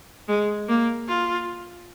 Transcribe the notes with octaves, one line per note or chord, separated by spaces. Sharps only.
G#3
A#3
F4